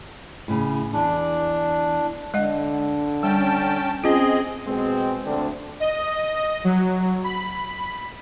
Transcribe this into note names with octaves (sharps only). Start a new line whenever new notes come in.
A2 C#3
E2 D4
D3 G#3 D#5 F#5
G3 C#4 G5 A5
C4 C#4 F4 G#4 D#5
B2 G#3 C4
D2 D3 C4 D4
D#5
F#3
B5